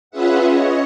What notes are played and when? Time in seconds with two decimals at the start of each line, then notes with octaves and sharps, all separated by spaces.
0.11 C#4 F4 G#4 B4 E5 F#5
0.50 C#5 D#5